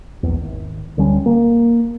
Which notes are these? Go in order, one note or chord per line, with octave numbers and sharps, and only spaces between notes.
A#1 E2
G#1
D1 D2 G3 C#4
A#3